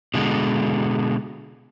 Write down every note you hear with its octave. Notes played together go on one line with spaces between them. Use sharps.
B2 D3 G3 G#3